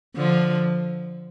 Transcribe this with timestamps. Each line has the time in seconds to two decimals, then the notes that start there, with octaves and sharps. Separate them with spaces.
0.16 D3 F3